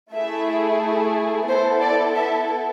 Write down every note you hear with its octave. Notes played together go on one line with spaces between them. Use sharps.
A3 E4 G#4 E5
B3 E4 A4 C5
D5
E5